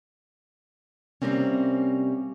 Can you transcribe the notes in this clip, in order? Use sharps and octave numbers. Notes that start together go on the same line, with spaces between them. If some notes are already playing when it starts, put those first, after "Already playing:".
C3 F#3 G3 A#3 C4 C#4